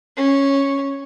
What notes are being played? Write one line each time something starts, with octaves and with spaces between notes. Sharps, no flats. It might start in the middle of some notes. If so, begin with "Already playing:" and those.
C#4